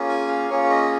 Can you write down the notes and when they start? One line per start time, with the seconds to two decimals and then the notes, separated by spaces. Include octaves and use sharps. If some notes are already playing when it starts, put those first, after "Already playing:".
Already playing: A#3 C#4 F4 G#4
0.09 G#5
0.28 F5
0.49 A#3 C#4 F4 G#4 C#5
0.70 D#5